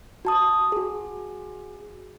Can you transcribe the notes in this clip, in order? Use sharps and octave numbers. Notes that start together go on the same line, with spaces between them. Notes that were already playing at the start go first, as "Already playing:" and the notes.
F#4 A5 D#6
F#4 G#4